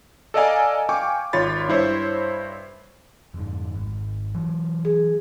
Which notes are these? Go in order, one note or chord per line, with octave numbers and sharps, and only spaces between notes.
A4 D5 D#5 F5 G#5 A#5
F5 G5 G#5 C#6 D6
G#1 F4 C#5 B5 A6
G2 E4 C5 C#5
F1 G#2
G#1
E3 F#3
G#4